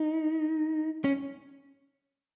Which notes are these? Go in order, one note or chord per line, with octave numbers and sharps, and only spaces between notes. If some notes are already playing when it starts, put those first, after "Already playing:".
Already playing: D#4
C#4